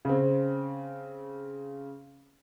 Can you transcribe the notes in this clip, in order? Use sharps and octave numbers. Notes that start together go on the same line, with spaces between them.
C#3 C4